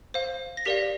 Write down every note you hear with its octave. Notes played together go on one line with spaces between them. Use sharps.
C5 F5
A#6
G4 A#4 D5 F5 B6